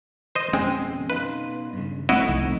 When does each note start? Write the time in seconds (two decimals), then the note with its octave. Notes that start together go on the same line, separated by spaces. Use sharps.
0.35 C5 D#5
0.53 F2 B2 G#3 C4 C#4
1.10 B2 D#4 F4 B4
1.73 G2 C#3
2.09 A3 C4 E4 F#4 D#5
2.28 C2 F3 A3 D#4